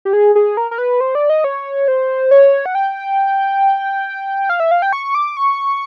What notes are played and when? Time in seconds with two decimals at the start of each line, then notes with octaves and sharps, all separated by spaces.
0.05 G4
0.13 G#4
0.35 G#4
0.57 A#4
0.71 A#4
0.78 B4
1.01 C5
1.15 D5
1.30 D#5
1.44 C#5
1.88 C5
2.31 C#5
2.66 F#5
2.75 G5
4.49 F5
4.60 E5
4.71 F5
4.82 G5
4.93 C#6
5.15 D6
5.37 C#6